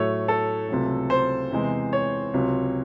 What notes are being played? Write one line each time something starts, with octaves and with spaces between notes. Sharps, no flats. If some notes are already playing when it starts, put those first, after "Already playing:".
Already playing: A2 F#3 A3 C#5
A4
C#2 C3 F#3 A3
C5
E2 C3 E3 G#3
C#5
C#2 C3 F#3